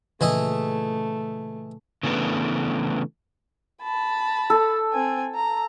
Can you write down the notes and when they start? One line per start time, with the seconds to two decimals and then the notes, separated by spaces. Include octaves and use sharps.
0.21 A#2 C#3 E3 A3 E4 D#5
2.03 C#3 E3 A3 B3 D4
3.82 A5 B5
4.50 A4
4.93 C4 G#5
5.35 A#5